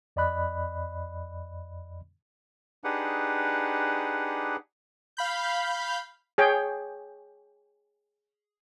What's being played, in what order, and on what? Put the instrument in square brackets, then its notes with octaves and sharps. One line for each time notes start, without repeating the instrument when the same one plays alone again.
[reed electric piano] F2 D5 D#5 B5 F#6
[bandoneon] D4 D#4 G4 G#4 B4 F#5
[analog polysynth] F5 B5 G6
[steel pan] G#4 C#5 G5